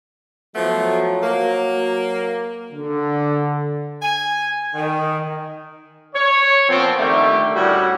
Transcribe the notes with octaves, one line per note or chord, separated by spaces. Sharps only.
F3 F#3 A3 B3
A#3
D3
G#5
D#3
C#5
A#2 F3 B3 C4
D3 D#3 G3 A3 G4
A2 G3 C#4 F#4